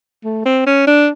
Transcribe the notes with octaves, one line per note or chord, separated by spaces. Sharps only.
A3
C4
C#4
D4